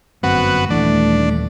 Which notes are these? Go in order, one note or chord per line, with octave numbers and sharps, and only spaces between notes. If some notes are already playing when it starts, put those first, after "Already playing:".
G1 F#2 B3 C4 F#4
D#1 E3 A3 D4